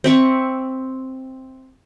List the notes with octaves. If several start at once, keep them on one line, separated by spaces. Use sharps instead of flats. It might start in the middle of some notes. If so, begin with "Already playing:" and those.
C4 E5 C#6